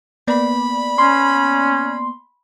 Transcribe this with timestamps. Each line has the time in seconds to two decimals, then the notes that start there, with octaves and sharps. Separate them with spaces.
0.27 A#3 B3 D5 B5
0.98 C#4 C6